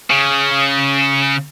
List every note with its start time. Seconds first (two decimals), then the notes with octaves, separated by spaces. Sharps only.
0.10 C#3